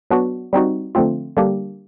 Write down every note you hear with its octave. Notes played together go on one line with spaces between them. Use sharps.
F#3 B3 D4 F#4
G3 C4 D#4 F#4
D3 F3 A3 C4 F4
D3 G3 A#3 D4 G4